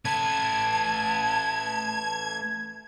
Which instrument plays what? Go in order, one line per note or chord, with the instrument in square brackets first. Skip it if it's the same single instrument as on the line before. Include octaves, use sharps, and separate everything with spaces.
[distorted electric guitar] A3 B4 [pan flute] A5 [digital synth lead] G#6